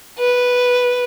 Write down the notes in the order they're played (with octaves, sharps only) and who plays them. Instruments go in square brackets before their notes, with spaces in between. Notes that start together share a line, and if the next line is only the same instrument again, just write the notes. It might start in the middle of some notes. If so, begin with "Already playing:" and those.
[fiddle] B4